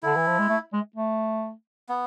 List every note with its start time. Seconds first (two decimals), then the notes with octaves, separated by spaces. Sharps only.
0.03 D3 E4
0.17 E3
0.27 F3
0.39 G#3
0.49 A3
0.73 G#3
0.96 A3
1.89 B3